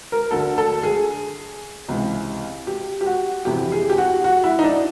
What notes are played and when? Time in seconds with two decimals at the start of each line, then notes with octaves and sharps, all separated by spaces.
0.12 A#4
0.31 D2 D3 A4
0.58 A4
0.83 G#4
1.88 C#2 C3 E3
2.67 G4
3.01 G4
3.06 F#4
3.45 F2 C3 E3 G4
3.72 G#4
3.90 G4
3.98 F#4
4.24 F#4
4.44 E4
4.59 D#4
4.64 D4